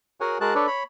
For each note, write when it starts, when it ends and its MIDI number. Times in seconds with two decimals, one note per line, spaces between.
0.21 0.38 66
0.21 0.38 68
0.21 0.38 70
0.21 0.38 73
0.21 0.38 78
0.21 0.38 80
0.41 0.54 56
0.41 0.54 66
0.41 0.54 68
0.41 0.54 70
0.41 0.54 81
0.41 0.54 90
0.55 0.67 62
0.55 0.67 69
0.55 0.67 71
0.55 0.67 73
0.55 0.67 74
0.67 0.83 73
0.67 0.83 83